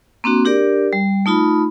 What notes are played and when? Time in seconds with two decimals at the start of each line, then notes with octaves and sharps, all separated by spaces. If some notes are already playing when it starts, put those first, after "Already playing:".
0.24 A#3 C4 D4 F#4
0.45 D4 G4 A#4 D5
0.93 G3
1.26 A3 D#4 F4 B5